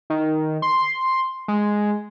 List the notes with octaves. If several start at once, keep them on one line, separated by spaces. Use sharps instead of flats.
D#3
C6
G#3